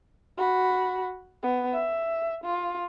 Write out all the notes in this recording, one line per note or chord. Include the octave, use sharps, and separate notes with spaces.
F#4 B5
B3
E5
F4